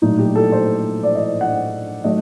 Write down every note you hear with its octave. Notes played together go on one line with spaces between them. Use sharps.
A#2 F#3 A3 D#4
G4
A4
C5
D5
D#5
F#5
D#3 F#3 A3 D#5